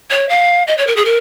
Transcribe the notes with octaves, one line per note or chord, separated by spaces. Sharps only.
C#5
F5
D#5
C#5
A#4
G#4
A#4